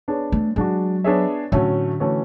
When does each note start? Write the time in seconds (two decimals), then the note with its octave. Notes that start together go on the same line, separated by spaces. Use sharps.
0.08 B3 D4 G#4 C#5
0.32 A3
0.56 F#3 G#3 D4 F#4
1.04 B3 D4 G#4 C#5 E5
1.52 A2 D3 F#3 A3 C#4 F#4
2.00 E3 A3 C#4 F#4 C#5